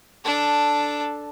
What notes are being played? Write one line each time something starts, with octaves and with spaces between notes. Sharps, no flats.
D4 A4